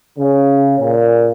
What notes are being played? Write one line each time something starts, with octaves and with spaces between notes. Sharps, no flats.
C#3
A#2